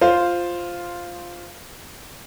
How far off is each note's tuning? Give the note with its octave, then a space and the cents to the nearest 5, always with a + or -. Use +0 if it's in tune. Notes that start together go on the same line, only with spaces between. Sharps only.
F4 +0 C5 +0